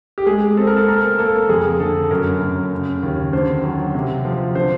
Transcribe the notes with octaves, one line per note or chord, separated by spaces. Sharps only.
G4
G#3 G#4
C4 A4
A#4
A4
A#3 A#4
A#3 A4
F2 G#4
D3 A4
F#2 A#4
F#2
C#3
D#2
D3 C5
F#3
C3
F3
D3 C5